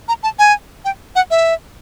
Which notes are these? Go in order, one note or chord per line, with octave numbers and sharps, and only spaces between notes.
A#5
A5
G#5
G5
F#5
E5